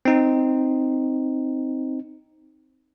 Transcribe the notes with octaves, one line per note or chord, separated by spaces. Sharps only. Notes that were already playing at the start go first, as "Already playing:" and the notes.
C4 D#4